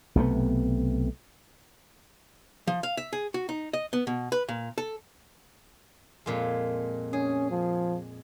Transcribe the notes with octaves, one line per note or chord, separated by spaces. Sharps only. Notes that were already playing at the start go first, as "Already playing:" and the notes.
B1 C3 A3 B3
F3
F5
E5
G#4
F#4
D#4
D#5
B3
B2
B4
A#2
A4
F2 A#2 G#3
C#4 G#4
F3